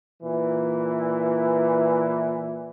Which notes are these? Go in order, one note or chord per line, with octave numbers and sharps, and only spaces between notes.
A#2 E3